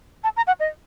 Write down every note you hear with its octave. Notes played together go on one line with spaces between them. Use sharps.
A5
A#5
F#5
D#5